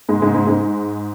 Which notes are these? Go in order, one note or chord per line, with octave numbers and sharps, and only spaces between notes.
G#2 G#3
G#2 G#3
G#2 G#3
G#2 G#3